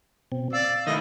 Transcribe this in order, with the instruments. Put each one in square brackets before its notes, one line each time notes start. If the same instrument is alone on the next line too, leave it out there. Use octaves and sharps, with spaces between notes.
[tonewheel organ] B2 C4
[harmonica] D5 E6 [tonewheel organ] F5
[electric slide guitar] D#3 A3 E4 [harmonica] D#5